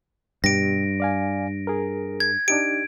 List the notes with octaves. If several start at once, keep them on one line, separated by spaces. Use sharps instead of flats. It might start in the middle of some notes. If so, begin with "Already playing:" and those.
G2 B2 G4 A#6 D7
D5 F5 G#5
G#4 A#4
G#6
D4 D#4 G4 D7